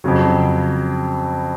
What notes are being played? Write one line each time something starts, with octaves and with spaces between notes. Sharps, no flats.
F2 C#3 F#3